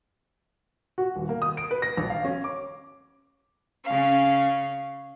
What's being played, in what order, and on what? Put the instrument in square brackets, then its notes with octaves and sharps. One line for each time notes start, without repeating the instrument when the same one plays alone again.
[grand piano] F#4
D#1
A#3
D#6
D7
B4
A#6
A#1
F5
C#4
D6
[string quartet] C#3 C#4 F5